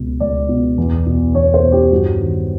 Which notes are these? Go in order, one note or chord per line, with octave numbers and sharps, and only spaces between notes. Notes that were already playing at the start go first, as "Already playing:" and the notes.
Already playing: C#2 B2
C#2 D5
B2
E2
B2
E2 C#5
C5
B2
G4
G2 F#4
D#3